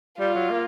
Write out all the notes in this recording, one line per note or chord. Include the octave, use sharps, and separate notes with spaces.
G3 F4
F#3
A#3